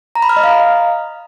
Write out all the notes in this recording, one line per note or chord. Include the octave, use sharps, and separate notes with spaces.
A#5
B5
F6
D#5
F5